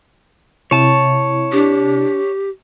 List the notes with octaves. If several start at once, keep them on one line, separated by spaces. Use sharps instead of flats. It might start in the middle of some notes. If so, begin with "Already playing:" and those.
C3 E4 C#5 A5
D4 G4